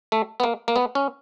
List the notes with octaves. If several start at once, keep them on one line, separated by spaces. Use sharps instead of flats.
A3
B3
A#3
A#3
B3
C#4